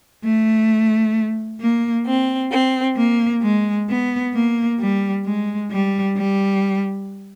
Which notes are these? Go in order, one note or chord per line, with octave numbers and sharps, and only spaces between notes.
A3
A#3
C4
C4
A#3
G#3
B3
A#3
G3
G#3
G3
G3